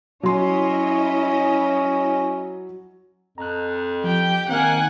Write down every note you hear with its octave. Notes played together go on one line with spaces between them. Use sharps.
F#3 C#4 E4 C#5 D#5 C6
F2 A#5 F#6
F3 G4 G5
D#3 A#3 C4 F#5 G#5 F6